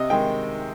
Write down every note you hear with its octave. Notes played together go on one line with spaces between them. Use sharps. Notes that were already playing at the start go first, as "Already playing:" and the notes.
Already playing: C3 D#5
D#3 G#3 G5